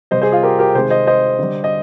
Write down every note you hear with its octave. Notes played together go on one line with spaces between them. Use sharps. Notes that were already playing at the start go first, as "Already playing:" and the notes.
C3 G3 C5 D#5
G#4 C5
F4 G#4
G4 A#4
G4 A#4
C3 D#3 G#3 G#4 C5
C5 D#5
C5 D#5
D3 G3
D#5